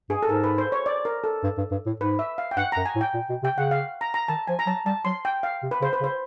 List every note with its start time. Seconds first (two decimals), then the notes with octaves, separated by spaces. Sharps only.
0.10 G2 G#4
0.23 A4
0.29 G#2 A#4
0.44 B4
0.58 C5
0.72 C#5
0.86 D5
1.05 A#4
1.24 A4
1.43 G2
1.58 G2
1.71 G2
1.87 A2
2.00 G#2 B4
2.19 E5
2.38 F5
2.51 G5
2.57 G2 F#5
2.72 F#2 A#5
2.86 G#5
2.96 A2
3.01 G5
3.14 A#2
3.30 B2
3.43 C3 G5
3.58 C#3 F#5
3.71 F5
4.01 A#5
4.14 A#5
4.28 D#3 A5
4.47 F3 G#5
4.59 A#5
4.67 F#3 A5
4.86 G3 A5
5.05 F#3 C6
5.25 G5
5.43 F5
5.63 C3
5.71 B4
5.81 C#3 C5
5.93 B4
6.01 C#3
6.04 C5